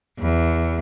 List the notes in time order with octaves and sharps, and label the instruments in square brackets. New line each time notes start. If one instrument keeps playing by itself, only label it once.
[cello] E2